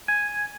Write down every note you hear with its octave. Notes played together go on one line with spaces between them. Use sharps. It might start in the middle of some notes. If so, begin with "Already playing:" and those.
G#5